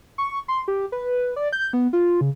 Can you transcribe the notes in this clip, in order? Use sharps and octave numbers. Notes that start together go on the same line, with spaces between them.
C#6
C6
G4
B4
D5
G6
B3
F4
C#3